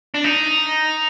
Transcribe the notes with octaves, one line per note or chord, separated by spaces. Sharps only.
D4
D#4